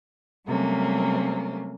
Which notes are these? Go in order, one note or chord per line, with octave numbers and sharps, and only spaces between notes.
C3 F#3 G3 A3 A#3 C#4